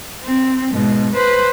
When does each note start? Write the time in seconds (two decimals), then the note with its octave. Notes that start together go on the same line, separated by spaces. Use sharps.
0.24 C4
0.72 G#2 B2
1.14 B4 C5